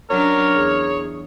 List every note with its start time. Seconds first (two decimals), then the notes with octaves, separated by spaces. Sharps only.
0.10 F#3 C#4 D4 A#4 C#5
0.55 E2 G#4